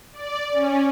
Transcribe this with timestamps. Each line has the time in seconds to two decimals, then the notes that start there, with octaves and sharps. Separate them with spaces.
0.12 D5
0.53 C#4